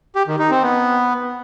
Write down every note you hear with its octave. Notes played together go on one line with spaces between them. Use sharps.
G4
D#3
D#4
C4
B3